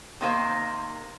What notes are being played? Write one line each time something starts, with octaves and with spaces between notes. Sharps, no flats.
C3 D#3 A#3 C5